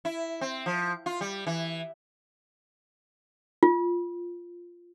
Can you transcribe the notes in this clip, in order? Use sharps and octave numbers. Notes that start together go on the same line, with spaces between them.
E4
C4
F3
F4
G3
E3
F4